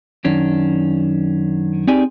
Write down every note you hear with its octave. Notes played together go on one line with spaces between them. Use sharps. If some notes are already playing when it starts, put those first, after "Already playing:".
F#2 D#3 C#4 D4
C4 D#4 G4 G#4 D5 G#5